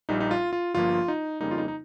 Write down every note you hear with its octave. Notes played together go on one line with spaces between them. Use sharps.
A#1 A#2 G3 D#4
D#4
F4
F4
G1 G2 F3 A#3 F4
D#4
F2 C#3 G3 A#3 D#4
F4
D#4
D#4